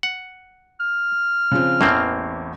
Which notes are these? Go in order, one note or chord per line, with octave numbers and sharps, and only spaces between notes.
F#5
F6
C#3 F3 C4
A1 E2 A2 A#3 C4